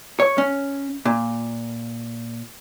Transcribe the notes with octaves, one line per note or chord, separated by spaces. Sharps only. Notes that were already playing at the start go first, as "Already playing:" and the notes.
C#5
C#4
A#2